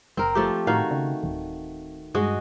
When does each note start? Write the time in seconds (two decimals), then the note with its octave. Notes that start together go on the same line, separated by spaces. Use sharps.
0.17 F#1 C4 A#4
0.35 F3 A3 G4
0.67 A2 D#3 F#4 F5
0.91 C#3
1.23 D1
2.15 G2 G#3 F#4 D#5